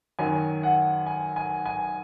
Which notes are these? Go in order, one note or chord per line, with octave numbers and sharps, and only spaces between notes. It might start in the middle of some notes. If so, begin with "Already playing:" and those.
F#2 D#3 F#3 G#5
F#5
G#5
G#5
G#5